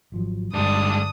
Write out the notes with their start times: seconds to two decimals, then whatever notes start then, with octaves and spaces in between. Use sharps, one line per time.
0.12 G#1 F3 F#3
0.53 G1 G2 G#3 D4 D#6